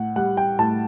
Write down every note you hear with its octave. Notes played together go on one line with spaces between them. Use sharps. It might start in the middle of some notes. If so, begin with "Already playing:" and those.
Already playing: A2 F#5
G3 F#5
G5
A2 A5